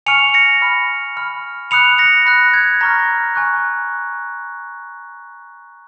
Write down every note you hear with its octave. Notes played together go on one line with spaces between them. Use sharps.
G#5 C#6 F6 C#7 F7
A#6 C#7
B5 F6
B5 F6
B5 D#6 F#6 C#7 F7
A#6 C#7
B5 F#6 A#6
G#6
A#5 C#6 F6 A#6
G#5 C#6 F#6